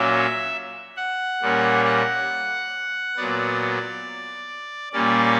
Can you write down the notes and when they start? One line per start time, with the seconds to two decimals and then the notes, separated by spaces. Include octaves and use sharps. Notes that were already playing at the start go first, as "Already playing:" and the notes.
Already playing: A#2 F#3 A#3 C#4 E5
0.97 F#5
1.42 A#2 G3 A#3 C#4
1.84 F#5
3.16 A#2 F#3 B3 D5
4.93 A#2 G3 A#3 C#4 D5